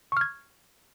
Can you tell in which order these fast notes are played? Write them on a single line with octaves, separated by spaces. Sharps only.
C#6 F6 G#6